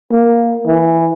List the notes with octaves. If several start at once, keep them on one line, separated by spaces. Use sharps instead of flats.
A#3
E3